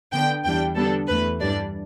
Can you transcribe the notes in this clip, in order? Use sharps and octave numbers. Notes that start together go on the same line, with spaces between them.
D3 B3 D4 G5
E2 E3 G3 D4 G5
D3 G3 B3 D4 A4
E2 E3 A3 B4
G2 E3 G3 D4 D5